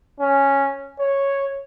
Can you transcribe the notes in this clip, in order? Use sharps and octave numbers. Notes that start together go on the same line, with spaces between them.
C#4
C#5